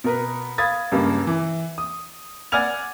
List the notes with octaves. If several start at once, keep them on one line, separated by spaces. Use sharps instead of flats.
B2 A#4 B4
F5 B5 D#6 G#6 A6
C#2 G2 C#3 A#3
E3
D#6
D5 F#5 G#5 F6 G#6 F7